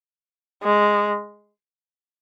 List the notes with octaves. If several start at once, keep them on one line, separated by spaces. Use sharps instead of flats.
G#3